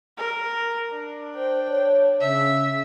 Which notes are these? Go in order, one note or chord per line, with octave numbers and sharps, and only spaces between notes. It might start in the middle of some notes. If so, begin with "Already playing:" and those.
A#4
D4
C5 G5
C#5
C#3 E5